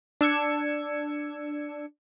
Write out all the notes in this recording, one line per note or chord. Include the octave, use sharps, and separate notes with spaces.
D4 E6 G#6 C#7